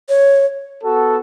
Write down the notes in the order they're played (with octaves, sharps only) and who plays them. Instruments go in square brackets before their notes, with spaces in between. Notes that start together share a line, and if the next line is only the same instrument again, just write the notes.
[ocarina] C#5
[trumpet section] B3 F#4 A4